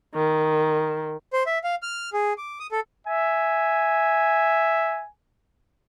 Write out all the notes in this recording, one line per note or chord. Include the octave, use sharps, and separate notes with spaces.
D#3
C5
E5
F5
F6
G#4
D6
D#6
A4
E5 G#5